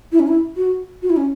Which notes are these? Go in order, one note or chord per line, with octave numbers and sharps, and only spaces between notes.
E4
C#4
E4
F#4
F#4
E4
C#4